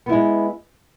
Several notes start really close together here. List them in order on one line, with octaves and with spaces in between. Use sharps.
B3 E4 G#3